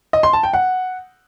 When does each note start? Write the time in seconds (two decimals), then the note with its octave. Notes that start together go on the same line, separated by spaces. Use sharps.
0.13 D#5
0.23 C6
0.33 A5
0.43 G5
0.53 F#5